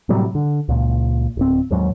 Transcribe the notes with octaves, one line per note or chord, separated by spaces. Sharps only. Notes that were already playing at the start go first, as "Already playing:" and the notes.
A2 C3 F#3 G3
D3
C#2 A#2
D1 C4
D#2 G#2 F#3